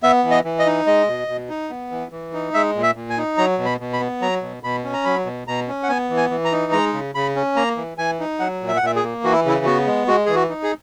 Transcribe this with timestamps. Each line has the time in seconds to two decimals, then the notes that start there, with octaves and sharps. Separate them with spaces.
0.03 B3 E5
0.24 E3
0.31 D#5
0.45 E3
0.59 D#5
0.66 D#4
0.87 G#3 D#5
1.08 B2
1.28 B2
1.49 D#4
1.70 B3
1.91 E3
2.12 E3
2.33 D#4
2.54 G#3 E5
2.75 A#2
2.83 E5
2.95 A#2
3.10 G#5
3.17 D#4
3.37 F#3 A#5
3.58 B2
3.65 B5
3.80 B2
3.93 B5
4.00 B3
4.21 F#3 A#5
4.42 B2
4.63 B2 B5
4.84 C#4
4.93 A#5
5.05 F#3 B5
5.26 B2
5.47 B2 A#5
5.68 C#4
5.83 F#5
5.89 B3 G#5
6.10 E3
6.17 G#5
6.30 E3
6.45 A#5
6.52 D#4
6.72 G#3 A#5
6.93 C#3
7.15 C#3 B5
7.36 C#4
7.56 A#3 A#5
7.77 E3
7.98 E3 G#5
8.20 D#4
8.40 F#3 F#5
8.61 A#2
8.68 E5
8.77 F#5
8.82 A#2 E5
8.96 G#4
9.03 A#3
9.24 E3 F#4
9.32 E4
9.45 C#3 E4
9.65 B3 F#4
9.87 G#3
10.07 G#3 F#4
10.26 E3 G#4
10.35 F#4
10.49 D#4
10.63 G#4